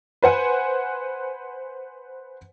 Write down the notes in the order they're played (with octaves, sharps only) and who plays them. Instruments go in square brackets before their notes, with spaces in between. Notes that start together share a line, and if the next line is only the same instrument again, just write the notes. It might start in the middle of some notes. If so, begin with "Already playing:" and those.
[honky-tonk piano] B4 C5 F#5 G#5